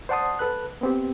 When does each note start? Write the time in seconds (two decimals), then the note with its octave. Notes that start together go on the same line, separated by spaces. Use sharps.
0.09 C5 D5 F#5 A5 C6 D#6
0.39 A4 B4 F#6
0.81 B3 C4 G4